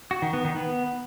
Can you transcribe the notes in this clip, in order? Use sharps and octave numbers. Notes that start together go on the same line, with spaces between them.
F#4
D#3
B3
D#3
B3